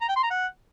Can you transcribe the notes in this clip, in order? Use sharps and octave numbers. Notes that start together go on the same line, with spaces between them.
A#5
G5
C6
A#5
F#5